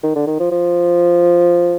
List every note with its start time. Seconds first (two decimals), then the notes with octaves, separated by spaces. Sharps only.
0.04 D#3
0.15 D3
0.27 D#3
0.40 F3
0.52 F3